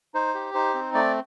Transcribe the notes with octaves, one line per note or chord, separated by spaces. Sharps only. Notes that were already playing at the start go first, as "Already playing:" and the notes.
D#4 C5
G4
D#4 C5
C4
A3 D5